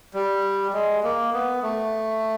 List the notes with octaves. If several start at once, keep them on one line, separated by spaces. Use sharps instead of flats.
G3
G#3
A#3
B3
A3